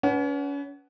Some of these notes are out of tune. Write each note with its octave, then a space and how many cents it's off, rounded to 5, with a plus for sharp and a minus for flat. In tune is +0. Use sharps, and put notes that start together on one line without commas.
C#4 +35 B4 +0 F#5 +20